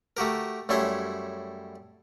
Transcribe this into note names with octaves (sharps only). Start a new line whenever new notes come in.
A3 F#4 G4 A#4
F#2 G3 A3 E4 C#5 C6